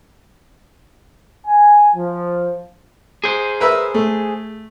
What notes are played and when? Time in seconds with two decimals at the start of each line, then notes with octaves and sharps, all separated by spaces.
1.46 G#5
1.96 F3
3.24 G#4 C5
3.61 A#4 B4 E5
3.94 A3